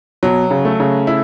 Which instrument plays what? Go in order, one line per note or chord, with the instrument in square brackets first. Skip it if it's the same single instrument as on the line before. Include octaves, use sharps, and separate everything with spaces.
[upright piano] B2 [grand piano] F#3
[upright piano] C#3
[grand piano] A3
[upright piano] C#3
[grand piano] E4